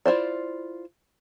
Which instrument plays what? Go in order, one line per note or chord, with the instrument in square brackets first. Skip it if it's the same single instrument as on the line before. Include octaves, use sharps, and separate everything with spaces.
[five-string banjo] E4 F4 C5 D5